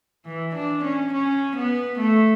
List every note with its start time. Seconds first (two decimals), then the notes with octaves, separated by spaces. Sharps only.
0.26 E3
0.55 D4
0.84 C#4
1.13 C#4
1.56 B3
1.99 A3